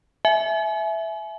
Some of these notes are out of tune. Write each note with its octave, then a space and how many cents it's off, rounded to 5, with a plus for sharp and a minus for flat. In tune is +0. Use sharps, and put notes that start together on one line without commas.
E5 +0 G#5 +35